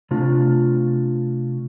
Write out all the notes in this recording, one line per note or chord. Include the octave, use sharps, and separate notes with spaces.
C3 A3 D4 F4